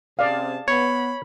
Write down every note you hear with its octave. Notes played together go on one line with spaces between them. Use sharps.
C3 C4 C#4 G#4 D5 F5 A5
B3 C#5 B5